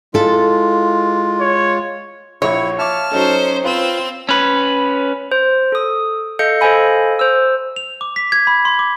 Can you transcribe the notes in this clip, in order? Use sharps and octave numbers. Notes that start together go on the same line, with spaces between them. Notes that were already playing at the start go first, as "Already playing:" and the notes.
G#3 E4 F4 A4
C#5
A#1 E4 C#5 C#6
E5 F5 A5 D6 F6
F#3 C#4 D#4 A4 C5
C4 F4 B4 E6
C#4 B4
C5
A4 D#6
A4 D#5 F5 G6 C#7
A4 C5 D#5 F5 G#5 B5
C5 E6
F7
D6
B6
G#6
B5
C6
D6